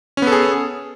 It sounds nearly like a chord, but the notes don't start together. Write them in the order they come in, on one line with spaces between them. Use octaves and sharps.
C#4 B3 A4 G#4